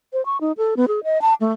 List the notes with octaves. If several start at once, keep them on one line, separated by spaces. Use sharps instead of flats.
C5
C#6
D#4
A4
B3
G#4
D#5
A5
A3